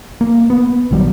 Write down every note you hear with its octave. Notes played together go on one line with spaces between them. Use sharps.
A#3
B3
A#1 D#3 F#3 G3